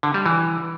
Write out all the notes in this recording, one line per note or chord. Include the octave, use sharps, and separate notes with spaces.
D3
G3
E3